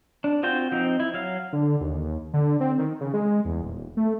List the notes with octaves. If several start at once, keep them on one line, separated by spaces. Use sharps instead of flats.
D4
C4 F4 F#4 C5 G5
F3 C4 D#4
E4
F#3 F5
D3
D#2
D3
C4
D#3
C#3
G#3
E2
D#1
A3